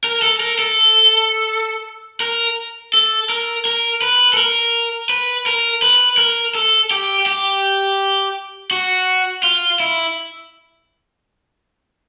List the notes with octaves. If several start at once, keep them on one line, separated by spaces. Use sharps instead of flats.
A#4
A4
A#4
A4
A#4
A4
A#4
A#4
B4
A4
A#4
B4
A#4
B4
A#4
A4
G4
G4
F#4
F4
E4